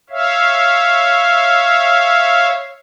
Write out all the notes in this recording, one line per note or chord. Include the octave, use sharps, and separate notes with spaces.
C#5 E5 F5